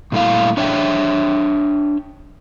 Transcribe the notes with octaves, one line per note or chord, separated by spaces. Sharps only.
A#2 G3 A3 E4 F5
D4 C#5 E5 G5